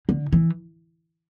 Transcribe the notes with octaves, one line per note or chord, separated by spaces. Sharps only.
D3
E3